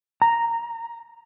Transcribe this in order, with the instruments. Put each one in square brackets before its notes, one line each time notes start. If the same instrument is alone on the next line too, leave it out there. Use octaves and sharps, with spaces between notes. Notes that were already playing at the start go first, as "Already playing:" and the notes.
[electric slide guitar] A#5